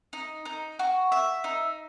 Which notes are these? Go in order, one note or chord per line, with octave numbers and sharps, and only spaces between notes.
D#4
D#4
F#4
E5
D#4